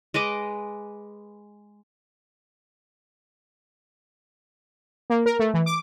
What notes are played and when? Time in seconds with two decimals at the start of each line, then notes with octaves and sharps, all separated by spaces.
0.14 G#3 B4 D#5 D6
5.10 A#3
5.26 A#4
5.39 A3
5.54 E3
5.66 D6